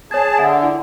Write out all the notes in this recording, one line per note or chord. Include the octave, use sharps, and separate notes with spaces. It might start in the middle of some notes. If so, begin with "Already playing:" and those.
G#4 C#5 A5 G#6
D3 E5 F#5 G#5
E4 F#5